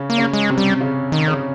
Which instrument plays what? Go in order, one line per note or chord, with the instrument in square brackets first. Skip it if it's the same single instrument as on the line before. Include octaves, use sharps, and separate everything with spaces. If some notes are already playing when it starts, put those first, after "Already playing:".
Already playing: [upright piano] C#3 C#4
[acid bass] A#3
[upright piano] C#3 C#4
[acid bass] G#3
[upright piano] C3 C4
[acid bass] G3
[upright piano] C#3 C#4
[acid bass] D#3
[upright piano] C#3 C#4